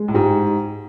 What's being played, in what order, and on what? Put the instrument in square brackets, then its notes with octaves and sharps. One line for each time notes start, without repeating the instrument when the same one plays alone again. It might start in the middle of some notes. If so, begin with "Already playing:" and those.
Already playing: [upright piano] G#3
[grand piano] A2
[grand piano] G#2 [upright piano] G4